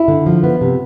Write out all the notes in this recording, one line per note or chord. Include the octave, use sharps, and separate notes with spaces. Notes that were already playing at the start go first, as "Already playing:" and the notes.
Already playing: E4
D3
F3
B3
C3